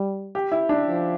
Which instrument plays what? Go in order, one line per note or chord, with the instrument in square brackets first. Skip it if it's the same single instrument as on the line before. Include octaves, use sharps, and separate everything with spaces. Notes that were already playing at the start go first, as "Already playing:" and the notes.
Already playing: [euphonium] G3
[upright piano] G4
E4
D4
[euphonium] F3